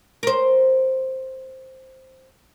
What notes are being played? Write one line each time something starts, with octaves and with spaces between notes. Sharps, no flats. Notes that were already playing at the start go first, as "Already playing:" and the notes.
A#4 C5